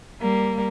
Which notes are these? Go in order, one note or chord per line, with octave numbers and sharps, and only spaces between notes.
G3 A#3